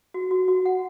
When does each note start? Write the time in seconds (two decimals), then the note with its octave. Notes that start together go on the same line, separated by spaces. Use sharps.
0.14 F#4
0.31 F#4
0.48 F#4
0.65 F#5